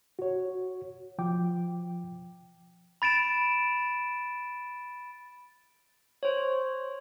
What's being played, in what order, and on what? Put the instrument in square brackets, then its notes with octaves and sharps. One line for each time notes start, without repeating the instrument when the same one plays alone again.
[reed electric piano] F#4 C#5
F3 G5 D6
[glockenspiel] B5 A6 D7 E7
[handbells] C5 C#5